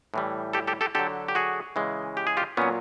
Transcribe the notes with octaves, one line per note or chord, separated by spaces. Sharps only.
A2 E3 G3
G4 A4
G4 A4
G4 A4
D3 F#3 G4 A4
G4
F#4 G#4
C#3 E3 G#3
G4
G#4
F4 G4
A#2 F#3 B3 C#4